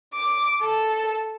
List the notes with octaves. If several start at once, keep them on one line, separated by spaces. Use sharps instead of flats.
D6
A4